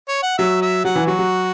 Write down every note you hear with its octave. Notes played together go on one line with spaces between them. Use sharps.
C#5
F#5
F#3 E5
E5
F#3 F#5
E3
F#3 F#4
F#3